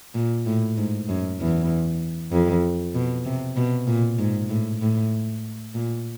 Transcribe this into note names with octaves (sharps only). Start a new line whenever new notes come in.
A#2
A2
G#2
F#2
E2
F2
B2
C3
B2
A#2
G#2
A2
A2
A#2